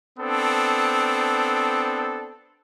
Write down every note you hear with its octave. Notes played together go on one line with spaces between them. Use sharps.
B3 C4 D4 A4